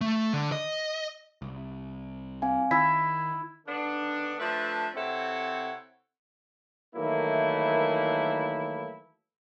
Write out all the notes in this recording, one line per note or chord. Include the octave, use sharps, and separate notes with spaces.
A3
D3
D#5
C2
C4 F5 G#5
D#3 E4 B6
D3 D#3 B3 D4
F3 A3 D4 B4 E5 A5
C3 C4 E4 A4 C#5 F#5
D#3 E3 F#3 A3 A#3 E4